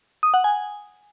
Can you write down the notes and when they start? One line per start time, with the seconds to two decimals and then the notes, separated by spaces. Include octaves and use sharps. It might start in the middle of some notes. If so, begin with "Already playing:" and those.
0.23 D#6
0.34 F#5
0.44 G#5